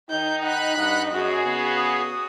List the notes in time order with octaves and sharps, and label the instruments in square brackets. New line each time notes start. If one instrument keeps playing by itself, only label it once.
[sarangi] D#3 [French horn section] D#4 [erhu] G6
[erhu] F#5 [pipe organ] B5 F#6
[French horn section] G2 D#4 [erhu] D#5 [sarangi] F#5
[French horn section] F#2 [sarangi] F#4 [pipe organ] G#4
[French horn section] C#3 B3
[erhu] D#6